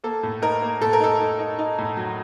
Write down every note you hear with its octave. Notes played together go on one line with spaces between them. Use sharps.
A#3 A4
A2
D#4 A#4
A#3
A2 A4
A#4
D#4 A4
D#4
D#4
D#4
A2
F#3